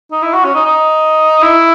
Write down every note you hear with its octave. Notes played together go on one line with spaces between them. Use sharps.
D#4
E4
F#4
C#4
D#4
D#4
E4